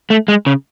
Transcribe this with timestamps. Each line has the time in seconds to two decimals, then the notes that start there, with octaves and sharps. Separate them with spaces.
0.10 A3
0.28 G#3
0.46 C#3